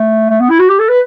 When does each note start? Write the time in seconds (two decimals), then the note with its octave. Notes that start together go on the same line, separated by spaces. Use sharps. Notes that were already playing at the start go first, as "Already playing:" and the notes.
Already playing: A3
0.30 A3
0.40 B3
0.50 E4
0.59 F#4
0.69 G4
0.79 A4
0.89 B4